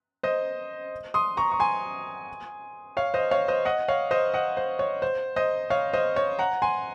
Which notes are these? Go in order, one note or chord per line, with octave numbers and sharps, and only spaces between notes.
C5 D#5
C6 D#6
A#5 C#6
C#6
G#5 C6
C#5 F5
C5 D#5
C#5 F5
C5 D#5
D#5 F#5
C#5 F5
C5 D#5
D#5 F#5
C5
C#5
C5
C5 D#5
C#5 F5
C5 D#5
C#5
F#5 A#5
G#5 C6